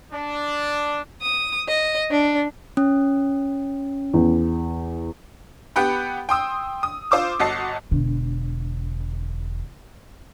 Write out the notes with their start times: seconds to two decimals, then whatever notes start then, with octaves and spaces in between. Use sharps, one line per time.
0.12 D4
1.22 D#6
1.67 D#5
2.11 D4
2.77 C#4
4.14 E2
5.76 B3 G4 F#5 G5 B5
6.29 G5 C6 D#6 E6
6.83 D#6
7.11 F4 C5 C6 D6 E6
7.40 G1 F#4 D#5 A5 C7
7.91 E1 D3